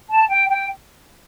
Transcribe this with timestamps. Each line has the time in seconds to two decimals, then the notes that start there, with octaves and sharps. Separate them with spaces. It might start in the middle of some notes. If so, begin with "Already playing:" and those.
0.09 A5
0.29 G5
0.49 G5